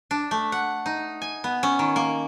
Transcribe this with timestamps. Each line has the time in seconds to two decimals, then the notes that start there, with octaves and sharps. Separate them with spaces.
0.11 D4
0.31 A3
0.52 F#5
0.86 D#4
1.22 G#5
1.44 B3
1.63 C#4
1.79 D#3
1.96 A#3